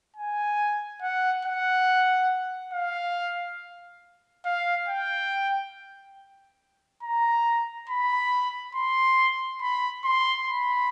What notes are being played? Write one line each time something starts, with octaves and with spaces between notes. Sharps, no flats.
G#5
F#5
F#5
F5
F5
G5
A#5
B5
C6
B5
C6
B5